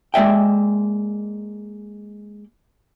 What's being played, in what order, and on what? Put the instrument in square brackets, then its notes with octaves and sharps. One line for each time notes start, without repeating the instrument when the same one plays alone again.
[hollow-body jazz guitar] G#3 A#3 D5 E5 G5